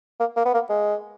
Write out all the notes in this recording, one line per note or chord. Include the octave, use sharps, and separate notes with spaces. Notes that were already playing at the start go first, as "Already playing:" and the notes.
A#3
A#3
B3
A#3
G#3